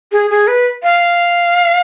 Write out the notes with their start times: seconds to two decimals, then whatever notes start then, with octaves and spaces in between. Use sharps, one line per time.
0.12 G#4
0.30 G#4
0.47 B4
0.83 F5